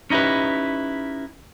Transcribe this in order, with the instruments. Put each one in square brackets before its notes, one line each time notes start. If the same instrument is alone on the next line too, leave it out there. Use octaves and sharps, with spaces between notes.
[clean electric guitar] C#4 D#4 E4 G4 B4